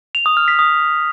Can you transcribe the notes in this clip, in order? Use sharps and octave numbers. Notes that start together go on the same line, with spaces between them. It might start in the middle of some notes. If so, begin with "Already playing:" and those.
F7
D#6
F6
B6
D#6